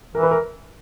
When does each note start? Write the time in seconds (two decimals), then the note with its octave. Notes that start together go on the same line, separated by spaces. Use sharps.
0.15 E3 A#4
0.23 B4
0.31 A#4